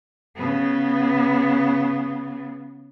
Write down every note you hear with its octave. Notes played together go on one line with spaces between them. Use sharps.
C#3 B3